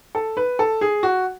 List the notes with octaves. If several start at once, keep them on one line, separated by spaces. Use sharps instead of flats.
A4
B4
A4
G#4
F#4